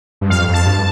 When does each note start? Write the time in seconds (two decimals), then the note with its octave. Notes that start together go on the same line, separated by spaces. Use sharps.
0.21 G2
0.30 F2 F5
0.48 F2
0.54 A5
0.66 G2